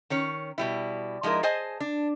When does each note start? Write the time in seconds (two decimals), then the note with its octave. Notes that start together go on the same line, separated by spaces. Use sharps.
0.10 D#3 C#4 C#5
0.58 B2 G3 E4
1.23 F3 G#3 D#4 E4 A#4
1.43 G#4 C5 D#5 G#5 A5
1.80 D4